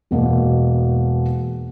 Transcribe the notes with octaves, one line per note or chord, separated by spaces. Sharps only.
E1 B2 A#3